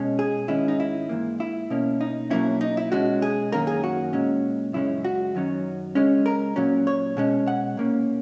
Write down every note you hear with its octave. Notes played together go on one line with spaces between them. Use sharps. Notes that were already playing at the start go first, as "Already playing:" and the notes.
Already playing: B2 G#3 C#4
G#4
G#2 D#3 G#3 C#4 E4
D#4
E4
G#2 E3 A#3
E4
B2 A#3 C#4
D#4
B2 F#3 A#3 C#4 E4
D#4
E4
B2 G#3 C#4 F#4
G#4
F#2 D#3 A#3 C#4 A#4
G#4
F#4
A#2 G#3 C#4
F#2 C#3 G#3 C#4 E4
F#4
F#2 D#3 F#3 C#4
C#3 G#3 C#4
A#4
A#2 F#3 C#4
C#5
B2 G#3 C#4
F#5
A#2 A#3 C#4